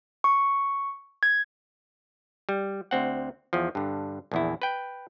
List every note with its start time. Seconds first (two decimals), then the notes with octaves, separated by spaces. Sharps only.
0.24 C#6
1.23 G#6
2.49 G3
2.91 D2 C4 F#5
3.53 E2 F3
3.75 G2 D3
4.32 A#1 E2 E4
4.62 B4 G5